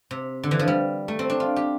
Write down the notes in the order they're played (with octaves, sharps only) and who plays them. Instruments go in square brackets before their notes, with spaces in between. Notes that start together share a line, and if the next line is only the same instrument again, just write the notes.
[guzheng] C3
D3
E3
F3
G3
A3
C4
D4
F4
G4